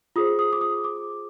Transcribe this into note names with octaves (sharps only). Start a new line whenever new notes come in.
F4 G#4 C5 D#6
D#6
D6
D#6
D6